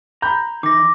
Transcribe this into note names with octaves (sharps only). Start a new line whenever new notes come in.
A#5 B5 G6
E3 D#4 D6 A#6